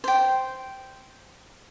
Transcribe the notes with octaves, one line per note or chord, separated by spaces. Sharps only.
C5 G5